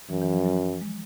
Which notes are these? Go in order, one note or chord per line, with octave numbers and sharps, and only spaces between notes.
F#2 E3
E3
F3
F#3
G#3